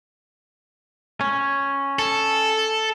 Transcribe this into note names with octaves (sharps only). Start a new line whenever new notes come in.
C#4
A4